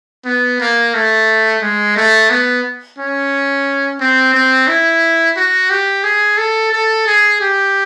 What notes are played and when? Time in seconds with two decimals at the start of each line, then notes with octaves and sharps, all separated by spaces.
0.25 B3
0.60 A#3
0.94 A3
1.62 G#3
1.96 A3
2.30 B3
2.98 C#4
4.00 C4
4.34 C4
4.68 E4
5.37 F#4
5.70 G4
6.03 G#4
6.38 A4
6.72 A4
7.07 G#4
7.41 G4